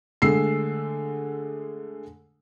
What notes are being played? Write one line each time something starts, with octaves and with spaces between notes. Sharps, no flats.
D3 G#3 A3 E6 C7